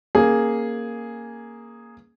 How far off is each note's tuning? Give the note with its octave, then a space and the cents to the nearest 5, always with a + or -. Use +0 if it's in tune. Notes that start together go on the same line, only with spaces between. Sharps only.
A#3 +0 C#4 -25 G#4 +0